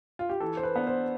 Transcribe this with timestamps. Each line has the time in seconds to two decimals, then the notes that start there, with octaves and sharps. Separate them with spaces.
0.19 F4
0.29 G4
0.40 E3 A4
0.57 C5
0.63 B4
0.75 B3 D4
0.87 C5